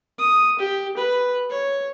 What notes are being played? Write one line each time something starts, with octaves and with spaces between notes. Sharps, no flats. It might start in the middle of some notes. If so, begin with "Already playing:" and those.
D#6
G4
B4
C#5